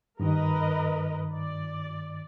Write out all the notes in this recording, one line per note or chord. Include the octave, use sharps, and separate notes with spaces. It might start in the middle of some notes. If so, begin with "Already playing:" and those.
G2 D#3 A#4 B4 D#5
D5